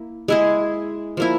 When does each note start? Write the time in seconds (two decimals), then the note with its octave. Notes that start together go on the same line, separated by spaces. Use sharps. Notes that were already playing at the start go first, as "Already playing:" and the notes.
Already playing: A#3 E4
0.28 G#3 E4 G#4
1.17 F3 A#3 E4